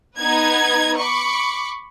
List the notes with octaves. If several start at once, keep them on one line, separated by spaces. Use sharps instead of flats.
B3 D#4 B4 G#6
B5 C#6 D6